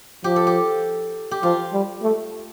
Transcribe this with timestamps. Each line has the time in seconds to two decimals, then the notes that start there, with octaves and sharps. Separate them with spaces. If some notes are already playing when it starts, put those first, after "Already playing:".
0.24 F3 G4
0.36 A4
0.47 G4
1.31 G4
1.43 F3 F4
1.73 G3
2.02 A3